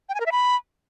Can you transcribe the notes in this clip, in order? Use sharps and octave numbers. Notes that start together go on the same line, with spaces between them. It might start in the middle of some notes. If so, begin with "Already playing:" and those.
G5
G#5
A#4
E5
B5